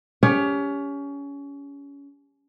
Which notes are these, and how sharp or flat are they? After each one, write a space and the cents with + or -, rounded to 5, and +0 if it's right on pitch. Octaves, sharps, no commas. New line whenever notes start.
C#4 +25 G4 +25